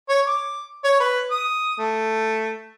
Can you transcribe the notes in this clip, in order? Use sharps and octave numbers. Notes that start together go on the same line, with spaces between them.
C#5
D6
C#5
B4
D#6
A3